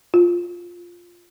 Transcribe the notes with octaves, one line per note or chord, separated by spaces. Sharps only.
F4